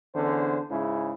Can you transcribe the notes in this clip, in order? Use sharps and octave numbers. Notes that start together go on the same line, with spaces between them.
E2 D3 C#4 C5
G#2 C#3 E4